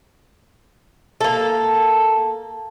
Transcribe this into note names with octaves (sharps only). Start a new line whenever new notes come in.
A#3 A4